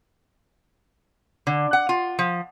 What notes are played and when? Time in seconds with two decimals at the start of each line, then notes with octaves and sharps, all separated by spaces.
1.47 D3
1.73 F#5
1.89 F4
2.19 F3